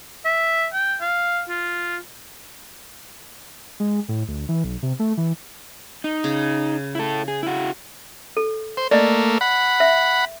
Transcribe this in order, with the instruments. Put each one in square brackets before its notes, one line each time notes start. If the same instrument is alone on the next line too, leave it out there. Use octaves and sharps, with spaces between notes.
[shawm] E5
G5
F5
F4
[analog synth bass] G#3
A2
D2
E3
B1
C3
A3
E3
[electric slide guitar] D#4
[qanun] C#3
[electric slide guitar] E4 A4
G#4
E4 F#4
[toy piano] A4
[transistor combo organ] C5
[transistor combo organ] A3 A#3 [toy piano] D5 D#5
[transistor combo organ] F#5 B5
[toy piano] E5